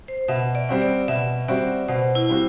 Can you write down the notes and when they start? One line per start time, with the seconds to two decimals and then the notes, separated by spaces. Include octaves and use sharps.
0.08 C5
0.28 B2 E5
0.55 D5
0.69 G3 C4 F#4
0.82 D5
1.08 B2 E5
1.48 G3 C4 F#4 D5
1.88 B2 C5
2.15 E4
2.29 G3 C4 F#4